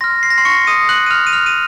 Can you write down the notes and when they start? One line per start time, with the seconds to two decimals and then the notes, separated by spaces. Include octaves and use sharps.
0.01 C6 F6 A#6
0.23 C7
0.30 A#6
0.38 C6 C7
0.45 C#6 C#7
0.67 D#6 D#7
0.89 F#6 F#7
1.06 D#7
1.11 F6 F7
1.27 D#7
1.33 F6 F7
1.46 D#7